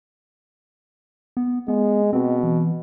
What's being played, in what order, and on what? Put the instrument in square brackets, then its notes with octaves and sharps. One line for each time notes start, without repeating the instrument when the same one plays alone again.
[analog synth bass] B3
[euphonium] G#3 [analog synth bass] B3
[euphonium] B2 [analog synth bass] C4
[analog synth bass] E3